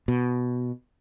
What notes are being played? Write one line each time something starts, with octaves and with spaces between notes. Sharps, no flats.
B2